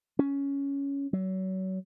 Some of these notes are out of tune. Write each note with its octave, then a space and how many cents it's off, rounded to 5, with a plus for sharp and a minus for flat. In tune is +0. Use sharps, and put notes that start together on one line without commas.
C#4 +10
F#3 +30